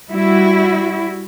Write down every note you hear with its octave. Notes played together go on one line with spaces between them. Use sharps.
G3 E4 F#4